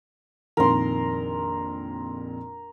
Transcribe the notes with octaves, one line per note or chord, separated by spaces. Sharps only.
A#1 F2 D#3 A#4 C6